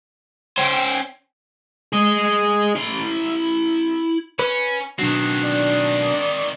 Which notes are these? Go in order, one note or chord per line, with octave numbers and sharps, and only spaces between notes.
C#4 C5 G5
G#4 D#5
E4 C6
C#4 B4
B2 D#3 F#3 C4 D4
D5